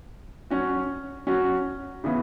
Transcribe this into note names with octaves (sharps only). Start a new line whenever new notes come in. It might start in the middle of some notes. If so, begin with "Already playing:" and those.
F#3 C#4 F#4
F#3 C#4 F#4
C#3 E3 B3